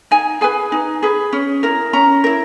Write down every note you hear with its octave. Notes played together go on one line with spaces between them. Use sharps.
D#4 G#5
G#4 B4 G#5
D#4
G#4 B4
C#4
E4 A#4
C#4 A#5
E4 A#4